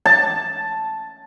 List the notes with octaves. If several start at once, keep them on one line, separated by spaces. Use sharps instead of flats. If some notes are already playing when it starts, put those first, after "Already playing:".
A5